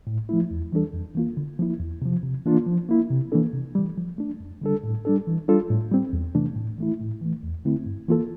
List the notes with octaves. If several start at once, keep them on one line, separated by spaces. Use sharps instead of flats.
A2
F3 A3 E4
E2
E3 G3 D4 A4
F2
E3 A#3 F4
D3
F3 A#3 E4
E2
C3 F3
C3
E3 A#3 D4 F4
F3
A#3 E4
C3
E3 A#3 D4 A4
C3
E3 G3
F3
A3 D4
F2
D3 G3 D4 A4
A2
G3 D4 A4
E3
G3 D4 F4 A4
A2
G3 C4
E2
C3 E3 A3 D4
A2
E3 A3 E4
A2
E3 A3
E2
D3 A3 C4 E4
G2
E3 A#3 F4 A4